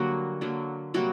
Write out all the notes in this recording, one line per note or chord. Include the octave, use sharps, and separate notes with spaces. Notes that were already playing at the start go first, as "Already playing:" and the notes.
Already playing: D3 F#3 G3 A#3 F#4
D3 F#3 A#3
C3 F#3 G3 A#3 F#4